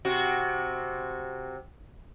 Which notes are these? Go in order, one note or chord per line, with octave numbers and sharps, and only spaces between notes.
C3 F#4